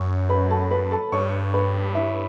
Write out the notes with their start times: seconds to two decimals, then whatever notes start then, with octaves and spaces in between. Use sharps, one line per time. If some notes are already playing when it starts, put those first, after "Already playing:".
Already playing: F#2 C#5 C#6
0.29 B4 B5
0.50 A4 A5
0.71 B4 B5
0.91 A4 A5
1.12 G2 C#5 C#6
1.54 B4 B5
1.95 E4 E5